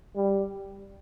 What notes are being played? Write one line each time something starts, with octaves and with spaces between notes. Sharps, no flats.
G3